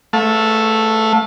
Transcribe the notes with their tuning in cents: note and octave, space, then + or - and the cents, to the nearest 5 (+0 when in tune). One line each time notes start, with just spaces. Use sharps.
A3 +0 F5 +40 A5 +0